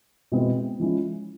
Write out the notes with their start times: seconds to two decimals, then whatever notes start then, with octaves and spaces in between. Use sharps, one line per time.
0.32 B2 G#3 C4 E4
0.79 F3 G#3 C#4 E4